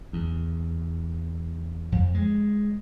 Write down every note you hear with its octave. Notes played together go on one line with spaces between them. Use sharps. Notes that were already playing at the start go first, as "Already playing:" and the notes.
E2
F2
G#3